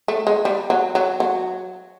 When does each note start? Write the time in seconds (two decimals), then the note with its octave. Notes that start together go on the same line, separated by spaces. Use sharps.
0.08 A3
0.27 G#3
0.45 G3
0.70 F#3
0.95 F#3
1.20 F#3